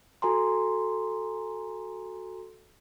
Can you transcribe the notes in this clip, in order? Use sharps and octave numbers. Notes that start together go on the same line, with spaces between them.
F#4 A4 G#5 A#5 C6